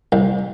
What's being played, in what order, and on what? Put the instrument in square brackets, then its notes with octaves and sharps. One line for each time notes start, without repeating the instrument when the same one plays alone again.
[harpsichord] C2